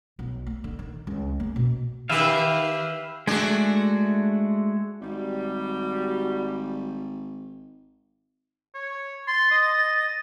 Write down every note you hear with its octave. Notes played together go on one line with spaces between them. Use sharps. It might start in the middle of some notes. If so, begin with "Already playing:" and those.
B1
A#3
D3
D#3
C#2
A#3
B2
D#3 G4 B4 E5 F5
G#3 A3 D4 F#4
G#1 G3 F#4
C#5
C6 A6
D#5